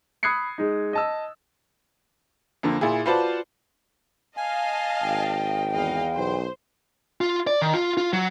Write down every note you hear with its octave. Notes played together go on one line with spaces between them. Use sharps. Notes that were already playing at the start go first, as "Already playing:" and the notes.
B5 D#6 F#6 G#6 C7 C#7
G#3 D#4
D#5 A5 E6
F2 D3 A#3
A#2 E4 G#4
F4 F#4 B4 C5 D5 A5
D#5 F5 G#5 A5
G#1 G5
E2 D#5 F5
B1 C5
F4
D5
D#3
F4
F4
F#3